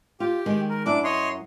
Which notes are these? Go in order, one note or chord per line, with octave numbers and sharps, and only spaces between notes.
F4 G4
D#3 G#3
A#4
F#2 D4 E4 D6
C#5 D#5 C6